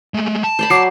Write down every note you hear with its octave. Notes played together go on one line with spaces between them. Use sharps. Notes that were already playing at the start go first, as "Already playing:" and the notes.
G#3 A3
A5
C5 D5 B5
F#3 D6 C7